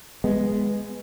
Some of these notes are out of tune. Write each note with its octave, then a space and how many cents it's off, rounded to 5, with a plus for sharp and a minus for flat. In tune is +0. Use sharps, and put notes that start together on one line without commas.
G#3 +0 B3 +0